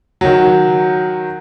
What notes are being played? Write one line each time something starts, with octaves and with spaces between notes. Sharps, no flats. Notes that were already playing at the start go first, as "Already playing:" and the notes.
D#3 F#3